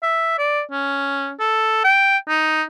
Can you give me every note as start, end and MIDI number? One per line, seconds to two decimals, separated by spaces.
0.03 0.37 76
0.39 0.62 74
0.72 1.31 61
1.40 1.83 69
1.85 2.18 79
2.28 2.63 63